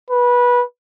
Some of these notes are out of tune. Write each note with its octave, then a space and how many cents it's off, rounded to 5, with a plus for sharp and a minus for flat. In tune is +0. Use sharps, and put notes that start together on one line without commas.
B4 -20